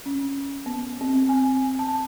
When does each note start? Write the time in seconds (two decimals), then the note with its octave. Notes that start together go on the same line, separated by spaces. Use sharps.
0.06 C#4
0.66 B3
1.01 C4
1.29 G#5
1.79 A5